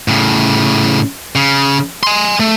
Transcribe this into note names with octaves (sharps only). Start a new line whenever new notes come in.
A2 C#3
C#3
G#5 C6
A3